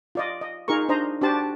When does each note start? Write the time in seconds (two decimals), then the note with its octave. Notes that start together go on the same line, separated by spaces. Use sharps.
0.15 F4 D5 D#5
0.41 D#5
0.68 D#4 F4 G#4 A#4 C#6
0.89 D4 C5 D#5 A#5
1.21 D4 F#4 G4 C5 D5 A5